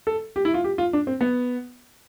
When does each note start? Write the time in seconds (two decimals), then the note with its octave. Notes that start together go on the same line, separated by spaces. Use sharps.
0.07 A4
0.36 G4
0.45 E4
0.54 F4
0.64 G4
0.78 F4
0.93 D4
1.07 C4
1.21 B3